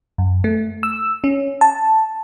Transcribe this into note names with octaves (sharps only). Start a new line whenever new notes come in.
F#2
A3
E6
C#4
A5